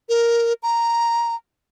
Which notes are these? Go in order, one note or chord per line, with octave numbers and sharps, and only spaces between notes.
A#4
A#5